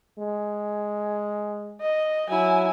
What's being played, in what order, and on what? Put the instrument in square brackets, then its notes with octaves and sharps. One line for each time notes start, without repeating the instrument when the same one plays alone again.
[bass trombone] G#3
[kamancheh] D#5
[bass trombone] F#3 [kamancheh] E4 G#5